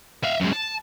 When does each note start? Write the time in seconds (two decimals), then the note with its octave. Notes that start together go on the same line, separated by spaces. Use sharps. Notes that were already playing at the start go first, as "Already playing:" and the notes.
0.24 E5 F5
0.40 F#2 G#3
0.52 A5